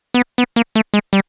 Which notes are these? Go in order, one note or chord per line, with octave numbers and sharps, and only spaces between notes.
B3
B3
A#3
A3
G#3
G3